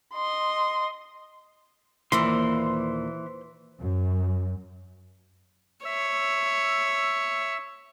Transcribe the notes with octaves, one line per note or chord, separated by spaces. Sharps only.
D#5 C6
D#2 A#2 E3 A#3 C5 C6
F#2
C#5 E5 E6